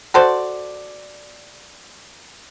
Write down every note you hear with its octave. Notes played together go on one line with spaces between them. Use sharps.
F#4 A4 C5 D5